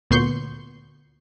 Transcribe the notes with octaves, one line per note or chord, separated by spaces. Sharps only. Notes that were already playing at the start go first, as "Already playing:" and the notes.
D2 A#2 B3 C6 C#6 G6